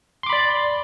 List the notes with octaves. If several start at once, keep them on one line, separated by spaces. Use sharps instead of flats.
D5 B5 C6 D6